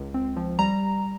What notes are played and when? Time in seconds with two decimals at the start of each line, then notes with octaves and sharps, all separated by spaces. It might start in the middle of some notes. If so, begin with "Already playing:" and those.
Already playing: C#2
0.14 C4
0.37 F3
0.59 G3 A#5